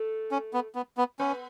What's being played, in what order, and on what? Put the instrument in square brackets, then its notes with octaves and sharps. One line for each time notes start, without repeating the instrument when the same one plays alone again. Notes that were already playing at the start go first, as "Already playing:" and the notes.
Already playing: [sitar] A3 A4
[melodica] C#4
B3
B3
B3
[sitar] B3 B4 [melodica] C#4